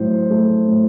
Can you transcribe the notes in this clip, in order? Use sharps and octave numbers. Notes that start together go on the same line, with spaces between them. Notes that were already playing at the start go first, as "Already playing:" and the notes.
Already playing: A2 F#3 C5
A3
A2